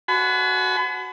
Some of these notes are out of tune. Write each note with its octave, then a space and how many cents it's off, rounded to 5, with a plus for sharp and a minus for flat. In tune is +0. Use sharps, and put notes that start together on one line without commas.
F#4 +0 G#5 +45 B5 +35